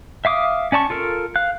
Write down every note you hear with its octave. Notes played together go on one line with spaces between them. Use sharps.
E5 F5 D6 D#6
C#4 D5 A5 C#6
F4 A4 A#4
F5 F#6